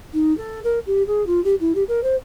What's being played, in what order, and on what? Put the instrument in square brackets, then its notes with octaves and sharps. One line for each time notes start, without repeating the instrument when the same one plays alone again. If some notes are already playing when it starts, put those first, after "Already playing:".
[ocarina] D#4
A4
A#4
G4
G#4
F4
G4
E4
G4
A#4
C5